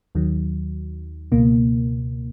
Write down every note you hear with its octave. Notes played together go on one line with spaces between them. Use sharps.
D#2 D#3 F#3
C#2 B2 A#3